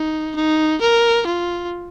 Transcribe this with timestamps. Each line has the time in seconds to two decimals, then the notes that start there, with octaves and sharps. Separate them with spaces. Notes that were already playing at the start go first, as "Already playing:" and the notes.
Already playing: D#4
0.35 D#4
0.81 A#4
1.26 F4